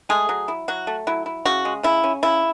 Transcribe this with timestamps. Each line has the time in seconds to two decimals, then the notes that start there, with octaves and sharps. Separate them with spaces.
0.09 G#3 A3 G#4
0.29 F#3
0.48 E4
0.68 F#3 F#4
0.87 A3
1.07 F#3 E4
1.26 E4
1.45 C#3 F#4
1.65 G#3
1.83 C#3 E4
2.04 C#4
2.23 C#3 E4